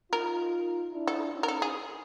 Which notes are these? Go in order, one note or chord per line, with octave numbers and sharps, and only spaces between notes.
D#4 F4 A#4
D4 E4
A4
C#4 D#4
A#4
A4
G#4